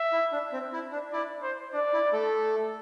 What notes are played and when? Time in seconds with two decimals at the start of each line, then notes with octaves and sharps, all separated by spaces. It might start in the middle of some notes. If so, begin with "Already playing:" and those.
Already playing: E5
0.12 E4
0.32 D4
0.52 C4
0.73 E4
0.92 D4
1.12 E4 D5
1.42 C5
1.73 D4 D5
1.93 E4
2.13 A3 A4